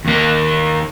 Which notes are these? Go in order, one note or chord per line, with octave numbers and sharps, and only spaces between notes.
D#2 A#3